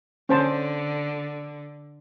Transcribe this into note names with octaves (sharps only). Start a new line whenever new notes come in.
D3 C#4 C5 A5